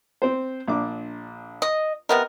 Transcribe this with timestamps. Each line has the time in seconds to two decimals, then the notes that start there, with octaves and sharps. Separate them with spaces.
0.22 C4 C5
0.68 A#1 D4 D6
1.62 D#5
2.09 C3 B3 A#4 D#5